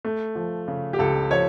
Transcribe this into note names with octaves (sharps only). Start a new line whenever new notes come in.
A3
F3
C#3
G4
C#2 A4
F3 C#5